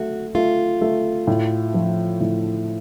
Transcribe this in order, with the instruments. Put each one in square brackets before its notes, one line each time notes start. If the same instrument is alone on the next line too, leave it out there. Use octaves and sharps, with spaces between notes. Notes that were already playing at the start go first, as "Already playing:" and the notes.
Already playing: [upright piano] A3 [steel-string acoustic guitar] F#4
[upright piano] A3 [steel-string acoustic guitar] F4
[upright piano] A3
A2
F3
A2